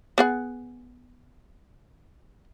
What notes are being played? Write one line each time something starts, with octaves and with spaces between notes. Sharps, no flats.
B3 G#4 F#5